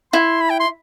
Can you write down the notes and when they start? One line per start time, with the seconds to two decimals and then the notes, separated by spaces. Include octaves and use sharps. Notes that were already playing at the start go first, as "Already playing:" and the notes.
0.13 E4 C6
0.41 B5
0.50 G5
0.60 C6